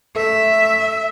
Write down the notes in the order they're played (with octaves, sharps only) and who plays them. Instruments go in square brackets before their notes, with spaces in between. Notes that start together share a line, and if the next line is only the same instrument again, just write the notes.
[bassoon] A3 [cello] E5